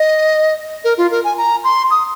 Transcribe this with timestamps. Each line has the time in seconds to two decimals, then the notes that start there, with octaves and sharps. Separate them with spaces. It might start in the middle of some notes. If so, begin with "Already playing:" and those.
Already playing: D#5
0.85 A#4
0.98 F4
1.11 A#4
1.24 G#5
1.38 A#5
1.64 C6
1.91 D#6